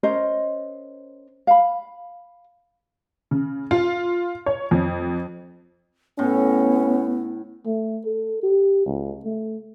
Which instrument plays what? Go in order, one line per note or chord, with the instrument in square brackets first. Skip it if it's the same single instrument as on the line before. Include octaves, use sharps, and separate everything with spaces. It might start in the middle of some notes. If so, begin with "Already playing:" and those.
[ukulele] C#4 A#4 C5 D#5
F5 B5
[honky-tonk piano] C#3
F4
C#5
F2
[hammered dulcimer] A2 [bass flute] B3 [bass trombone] C#4
[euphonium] A3
A4
G4
C#2
A3